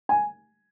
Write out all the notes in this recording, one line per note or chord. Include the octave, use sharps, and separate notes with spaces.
G#5